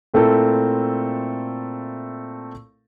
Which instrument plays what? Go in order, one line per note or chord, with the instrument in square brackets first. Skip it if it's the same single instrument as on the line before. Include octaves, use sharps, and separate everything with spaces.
[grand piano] A#2 A3 C4 E4 A4 A#4